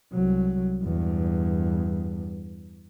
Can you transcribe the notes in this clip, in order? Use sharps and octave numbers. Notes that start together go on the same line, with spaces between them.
C2 F#3
E2 G2